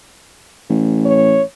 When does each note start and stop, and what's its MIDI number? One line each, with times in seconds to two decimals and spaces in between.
0.70 1.42 33
1.05 1.43 73